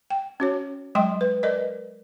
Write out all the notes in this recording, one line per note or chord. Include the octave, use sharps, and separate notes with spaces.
G5
C#4 F#4 C#5
F#3 G#3 D#5 G5 C6
B4
A#4 B4 D5 D#5